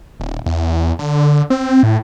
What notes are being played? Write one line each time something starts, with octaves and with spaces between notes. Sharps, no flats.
D#1
E2
D3
C4
A2